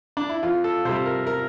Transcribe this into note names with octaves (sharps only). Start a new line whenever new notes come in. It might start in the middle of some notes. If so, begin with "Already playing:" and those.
D4
E4
F2 F4
A4
C3 G3 C5
A#4
A#4